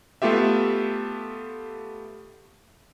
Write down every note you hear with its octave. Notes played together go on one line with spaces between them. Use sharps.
A3 B3 F4 G4 E5